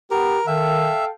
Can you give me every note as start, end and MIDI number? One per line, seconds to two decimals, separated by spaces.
0.11 0.35 59
0.11 0.40 67
0.11 0.46 70
0.47 0.90 51
0.47 1.10 69
0.47 1.05 76
0.47 1.10 77
0.47 1.10 79